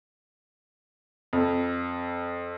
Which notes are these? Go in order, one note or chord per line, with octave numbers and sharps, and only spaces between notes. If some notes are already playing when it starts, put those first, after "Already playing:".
F2